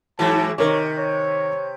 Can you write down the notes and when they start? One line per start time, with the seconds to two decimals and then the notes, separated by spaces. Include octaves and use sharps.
0.19 G#2 E3 F#3 A5
0.58 C3 D#3 A#4 C#5 D6
0.98 C#5